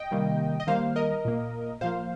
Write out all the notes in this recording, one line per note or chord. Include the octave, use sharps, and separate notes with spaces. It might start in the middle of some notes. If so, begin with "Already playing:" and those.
Already playing: D#5 G5
C3 D#3 G3 A#3
D#5
D#3 G3 A#3 C5 F5
A#4 D#5
A#2 A#3
A#2 F3 A#3 C5 F5